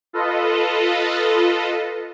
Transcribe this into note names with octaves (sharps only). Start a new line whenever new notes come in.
F4 A4 B4 D#5